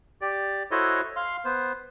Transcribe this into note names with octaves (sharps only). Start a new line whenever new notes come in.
G4 D5
E4 F#4 A4 C5 C#5 D#5
F5 C6
B3 C5